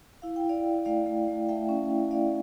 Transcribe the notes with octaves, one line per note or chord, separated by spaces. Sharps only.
E4 F5
G5
E4
D5 F5
E4
A3 D5 F5
A3
A3
A3 E5 G5
C#4
E4
E4 D5 F5